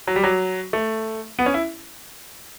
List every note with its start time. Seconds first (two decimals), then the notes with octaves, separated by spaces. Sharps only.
0.07 F#3
0.16 G3
0.24 F#3
0.73 A3
1.39 B3
1.46 C#4
1.54 E4